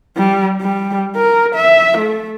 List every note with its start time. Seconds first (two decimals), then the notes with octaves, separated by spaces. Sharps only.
0.17 G3
0.60 G3
1.16 A#4
1.55 E5
1.98 A3